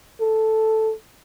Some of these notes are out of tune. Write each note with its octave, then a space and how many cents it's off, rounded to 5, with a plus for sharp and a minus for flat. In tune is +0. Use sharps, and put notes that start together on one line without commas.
A4 +0